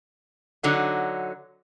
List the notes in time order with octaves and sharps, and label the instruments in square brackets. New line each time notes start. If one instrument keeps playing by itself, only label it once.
[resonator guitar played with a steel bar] D3 F#3 D#4